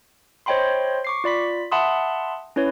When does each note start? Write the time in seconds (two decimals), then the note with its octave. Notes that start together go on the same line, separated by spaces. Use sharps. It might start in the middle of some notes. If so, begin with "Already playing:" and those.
0.46 C5 C#5 D#5 G5 B5 C6
1.05 C#6 D6 C7
1.24 F4 D5 B5 B6
1.71 E5 F#5 A5 B5 C6 D#6
2.56 C#4 E4 B4 C#5